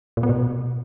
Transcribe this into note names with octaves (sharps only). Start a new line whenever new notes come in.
A#2
B3
B2